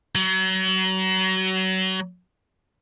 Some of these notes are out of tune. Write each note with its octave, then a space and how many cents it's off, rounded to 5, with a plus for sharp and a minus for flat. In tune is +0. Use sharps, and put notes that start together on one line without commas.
F#3 +30